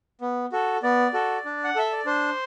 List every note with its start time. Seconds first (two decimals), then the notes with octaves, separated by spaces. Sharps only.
0.21 B3
0.52 F#4 A4
0.83 B3 D5
1.13 F#4 A4
1.45 D4
1.64 F#5
1.76 A4 E5
1.92 D5
2.05 D4 C5